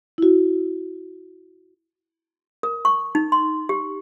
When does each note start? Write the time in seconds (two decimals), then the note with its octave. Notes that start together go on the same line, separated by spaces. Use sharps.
0.18 E4 F#4
2.63 A#4
2.85 C#6
3.15 D#4
3.32 C6
3.69 G4